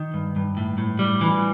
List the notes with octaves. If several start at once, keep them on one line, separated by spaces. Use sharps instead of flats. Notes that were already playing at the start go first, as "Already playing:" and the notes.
Already playing: D#3
G2
G2
A2
A2
G3
E3